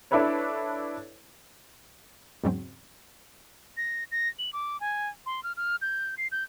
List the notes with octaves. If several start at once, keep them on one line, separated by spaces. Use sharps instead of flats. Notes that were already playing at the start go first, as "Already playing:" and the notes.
D4 E4 A4 B4 C#5
E2 G#2 C#3 F#3 C4
A#6
A#6
F#7
D6
G#5
C6
F6
F6
G6
C7
G6